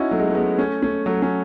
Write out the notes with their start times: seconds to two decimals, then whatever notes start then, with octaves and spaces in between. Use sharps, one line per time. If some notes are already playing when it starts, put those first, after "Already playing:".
Already playing: C#4 D#4 E4 F#4
0.11 F#3 A3
0.20 G#3
0.28 A3
0.35 G#3 B3
0.59 A3 C#4
0.82 A3 C#4
1.06 F#3 A3
1.22 A3 C#4